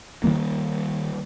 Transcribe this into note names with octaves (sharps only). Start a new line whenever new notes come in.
D#3 F#3 G3 A#3